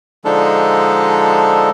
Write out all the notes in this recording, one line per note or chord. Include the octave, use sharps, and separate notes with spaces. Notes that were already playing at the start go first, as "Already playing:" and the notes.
D3 F3 G#3 D4 D#4 A4